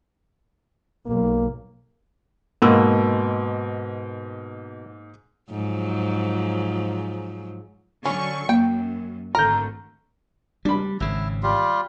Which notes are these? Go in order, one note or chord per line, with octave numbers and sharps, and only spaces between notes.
B1 A#3
G#2 B2 A#3 E6
G#2 F3 F#3
D3 F#3 C#4 C#6
F#2 A#3 G5
G#1 D3 A3 A#4 A#5 G6
G3 D4 B5
G#1 C#3 E4
G3 F4 G4